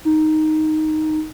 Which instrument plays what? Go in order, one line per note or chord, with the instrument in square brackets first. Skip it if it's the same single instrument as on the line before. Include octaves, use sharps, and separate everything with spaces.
[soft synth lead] D#4